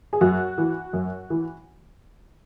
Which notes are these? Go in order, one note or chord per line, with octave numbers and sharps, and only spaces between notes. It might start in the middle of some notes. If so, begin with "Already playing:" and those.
G#4
F#2 F#4
E3
F#2
E3